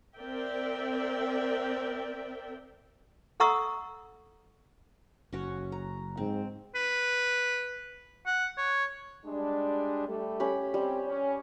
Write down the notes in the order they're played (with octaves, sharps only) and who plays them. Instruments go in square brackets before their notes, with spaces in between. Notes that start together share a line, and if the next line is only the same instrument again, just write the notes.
[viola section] C4 A#4 D5 E5 G5
[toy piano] A4 F#5 A#5 C#6 D#6 E6
[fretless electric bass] F#1 [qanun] C#4 F#4 C#5
[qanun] A#5
[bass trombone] G#2 [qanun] C4
[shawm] B4
F#5
C#5
[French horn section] G3 G#3 D4
G3 A3
[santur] C#4 G4 B5
[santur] G3 [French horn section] C4
[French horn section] C#4